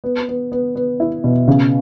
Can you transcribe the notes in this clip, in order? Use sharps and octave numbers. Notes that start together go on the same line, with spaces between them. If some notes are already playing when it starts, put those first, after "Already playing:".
B3
B3
B3
B3
E4
B2
C#3